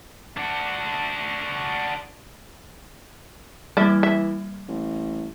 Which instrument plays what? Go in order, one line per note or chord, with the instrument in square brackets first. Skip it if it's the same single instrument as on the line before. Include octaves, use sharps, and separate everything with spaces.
[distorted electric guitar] D4 F#4
[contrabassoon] E3 [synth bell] G3 A#3 [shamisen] D5 E5
[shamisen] E5
[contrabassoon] A1